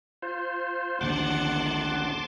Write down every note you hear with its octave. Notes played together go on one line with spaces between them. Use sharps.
F4 C5
A#1 D#2 D3 F#5 A5 C6 D6